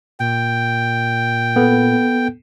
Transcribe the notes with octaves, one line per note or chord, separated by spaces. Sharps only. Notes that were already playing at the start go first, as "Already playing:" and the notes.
A#2 G5
B3 A4